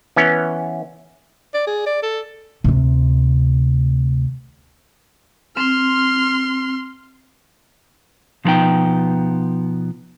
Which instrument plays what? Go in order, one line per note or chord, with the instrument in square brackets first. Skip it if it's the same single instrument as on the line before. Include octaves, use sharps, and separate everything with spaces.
[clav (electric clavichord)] E3 B3 C#4
[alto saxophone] D5
G#4
D5
A4
[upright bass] D2 C3
[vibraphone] C4 [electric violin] C6 F6
[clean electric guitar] B2 F3 F#3 B3 D#4 G5